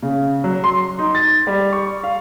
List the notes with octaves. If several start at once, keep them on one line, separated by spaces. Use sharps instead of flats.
C#3
F#3
C6
D#4
A6
G3
C#6
F5